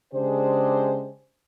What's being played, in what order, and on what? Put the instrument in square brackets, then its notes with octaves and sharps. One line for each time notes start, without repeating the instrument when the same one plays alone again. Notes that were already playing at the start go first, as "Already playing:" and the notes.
[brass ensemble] C#3 G#3 D4 G4 G#4 C5